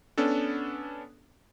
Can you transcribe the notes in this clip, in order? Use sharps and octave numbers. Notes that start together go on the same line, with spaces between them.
B3 C#4 D4 A4